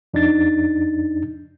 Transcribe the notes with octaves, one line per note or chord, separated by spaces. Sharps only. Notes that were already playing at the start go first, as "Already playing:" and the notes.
F2 D4 D#4 A6